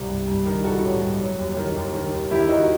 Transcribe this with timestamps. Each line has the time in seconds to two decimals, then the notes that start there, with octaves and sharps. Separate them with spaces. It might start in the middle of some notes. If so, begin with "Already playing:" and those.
Already playing: C2
0.09 G2
0.28 G2
0.46 D#3
0.64 D#3 F#4 A4
0.83 A1
1.01 G2
1.20 F#3
1.39 D#2
1.57 D#3
1.76 D#2
1.93 D#3
2.12 D#2
2.31 D#3 E4 G4
2.49 D#3 D#4 F#4